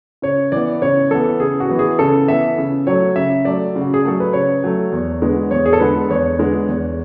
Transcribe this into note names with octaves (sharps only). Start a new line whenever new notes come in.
C#3 C#5
E3 B3 D5
C#3 C#5
E3 B3 A4
C#3 G#4
F#4
E3 B3
G#4
C#3 A4
E3 B3 E5
C#3
F#3 A3 C#5
C#3 E5
F#3 A3 D5
C#3
F#4
G#4
F#3 A3 A4
B4
C#3 C#5
F#3 A3
E2
D3 G#3 B3
E2 C#5
G#4
A4
D3 G#3 B3 B4
E2 C#5
D3 G#3 B3
E2